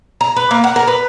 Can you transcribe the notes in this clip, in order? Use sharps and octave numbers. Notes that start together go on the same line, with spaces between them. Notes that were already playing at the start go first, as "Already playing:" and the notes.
A#5
B4
A#3
F#5
A#4
B4